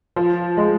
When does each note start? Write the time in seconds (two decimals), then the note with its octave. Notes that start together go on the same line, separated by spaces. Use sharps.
0.16 F3
0.57 G#3